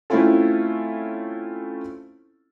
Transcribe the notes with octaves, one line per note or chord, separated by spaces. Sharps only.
A3 C4 C#4 E4 F4 A4